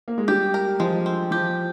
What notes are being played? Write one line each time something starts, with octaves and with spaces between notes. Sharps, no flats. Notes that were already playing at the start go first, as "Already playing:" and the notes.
A#3
G#3
G3 G4
A#4
F3 G#3
C4
F3 G4